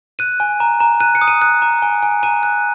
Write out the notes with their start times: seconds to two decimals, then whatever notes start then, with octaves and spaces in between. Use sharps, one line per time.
0.19 F#6 D#7
0.40 G#5
0.60 A#5
0.80 A#5
1.00 F#6 D#7
1.15 C#7
1.21 D#6
1.28 D#7
1.42 F#6
1.62 A#5
1.82 G#5
2.03 G#5
2.23 A#5 D#7
2.43 F#6